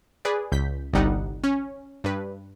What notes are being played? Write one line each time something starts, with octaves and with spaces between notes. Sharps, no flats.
G#4 B4 D5
C#2 G6 B6
G1 C2 G3 D#4 F#5
C#4
G2 B4